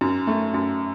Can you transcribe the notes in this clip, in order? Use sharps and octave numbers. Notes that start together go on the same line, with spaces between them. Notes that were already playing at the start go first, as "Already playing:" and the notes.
F#2
A3
F#2